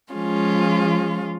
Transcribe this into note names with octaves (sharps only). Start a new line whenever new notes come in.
F3 G#3 C#4 F4